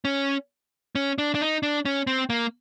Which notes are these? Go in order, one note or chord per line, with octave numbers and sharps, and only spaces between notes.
C#4
C#4
D4
D4
D#4
D4
C#4
C4
A#3